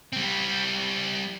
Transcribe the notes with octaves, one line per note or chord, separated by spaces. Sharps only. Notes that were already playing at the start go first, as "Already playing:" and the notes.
G3 C4